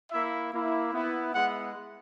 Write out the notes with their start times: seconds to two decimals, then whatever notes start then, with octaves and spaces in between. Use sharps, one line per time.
0.12 A#3 E4 E5
0.52 A#3 E4
0.92 B3 E4
1.33 G#3 B3 E4 F#5